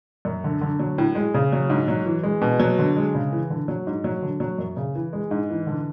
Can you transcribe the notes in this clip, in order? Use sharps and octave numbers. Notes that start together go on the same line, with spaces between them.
F#2
D3
D3
F#3
A2
G#3
C#3
F#3
G#2
F#3
E3
G#3
B2
F#3
D3
G#3
C#3
E3
D3
F#3
G#2
F#3
D3
F#3
F#2
C#3
E3
G#3
G#2
E3
D3